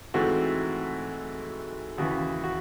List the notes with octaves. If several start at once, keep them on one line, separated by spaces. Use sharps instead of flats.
G#2 E3 A3 C4 F#4
D#2 C#3 E3 F#4
F#4